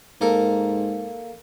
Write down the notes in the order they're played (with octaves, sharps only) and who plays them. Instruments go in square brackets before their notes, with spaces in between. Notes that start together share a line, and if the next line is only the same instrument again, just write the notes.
[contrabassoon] G#2 [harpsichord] A#3 A4 A#4